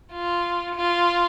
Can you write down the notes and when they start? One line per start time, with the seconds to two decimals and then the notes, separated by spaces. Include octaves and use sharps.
0.13 F4
0.75 F4